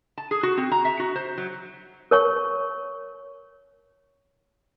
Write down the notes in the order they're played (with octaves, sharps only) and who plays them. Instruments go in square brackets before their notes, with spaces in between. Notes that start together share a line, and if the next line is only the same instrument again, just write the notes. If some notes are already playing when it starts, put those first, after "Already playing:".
[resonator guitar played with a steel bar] A5
G#4
F#4
C4
A#5
E5
F#4
C5
F#3
[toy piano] A#4 C#5 C#6